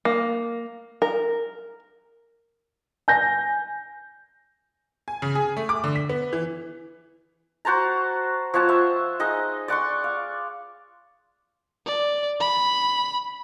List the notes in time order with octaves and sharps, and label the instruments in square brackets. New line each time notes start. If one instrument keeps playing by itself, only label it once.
[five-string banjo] A#3
A#4
[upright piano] G#5 G6 A#6
[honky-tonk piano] G#5
C#3
G#4
A3
D6
D3
B6
B3
E3
[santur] F#4 C5 A5 A#5
F3 C#5 F#5 A5
C5 E5 A5
D#4 G#4 D#5 F#5
D5 F#5 C6 C#6
F5
[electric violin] D5
B5